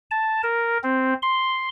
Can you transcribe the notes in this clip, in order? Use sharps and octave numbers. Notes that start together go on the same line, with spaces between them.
A5
A#4
C4
C6